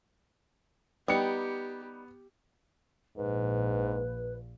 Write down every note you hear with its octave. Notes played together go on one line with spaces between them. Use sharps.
G3 B3 D#4 G4 C#7
A#1 G#2 B4